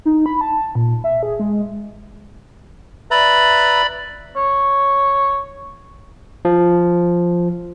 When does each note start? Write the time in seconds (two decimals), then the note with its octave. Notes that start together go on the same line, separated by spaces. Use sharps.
0.05 D#4
0.26 B5
0.41 A5
0.75 A#2
1.04 E5
1.23 G#4
1.39 G#3
3.11 B4 D5 E5 A#5 B5
4.36 C#5
6.45 F3